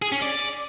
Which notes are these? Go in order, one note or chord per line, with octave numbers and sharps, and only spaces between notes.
G#4
C#4
D5